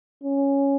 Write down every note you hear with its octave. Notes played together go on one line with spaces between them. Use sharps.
C#4